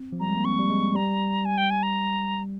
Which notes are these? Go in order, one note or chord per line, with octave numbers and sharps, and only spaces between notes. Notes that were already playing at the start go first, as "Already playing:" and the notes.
Already playing: C4
F3
G3 A#5
G#3
A#3
C4 C#6
G3
G#3
G3 A#5
G#5
G5
G#5
A#5